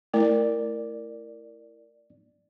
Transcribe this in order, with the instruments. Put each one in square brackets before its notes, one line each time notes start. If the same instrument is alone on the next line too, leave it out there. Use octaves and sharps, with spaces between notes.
[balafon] A3 [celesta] E4 A#4 [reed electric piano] D5